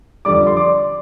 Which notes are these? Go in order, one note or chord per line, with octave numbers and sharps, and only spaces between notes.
F2 D3 G3 D5 D6
C6
D5 D6